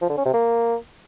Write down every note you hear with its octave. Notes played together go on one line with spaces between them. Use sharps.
F3
D3
C#4
C3
A#3